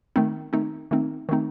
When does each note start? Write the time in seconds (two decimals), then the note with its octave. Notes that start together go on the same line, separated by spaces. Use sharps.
0.16 D#3 A3 C4 D#4
0.53 D#3 A3 C4 D#4
0.91 D#3 A3 C4 D#4
1.29 D#3 A3 C4 D#4